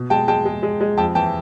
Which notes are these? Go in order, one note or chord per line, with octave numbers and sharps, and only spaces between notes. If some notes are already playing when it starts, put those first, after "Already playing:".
Already playing: B2
G#3 G5 A5
G#3 G5 A5
G#3
G#3
G#3
F2 G5 A5
E3 G5 A5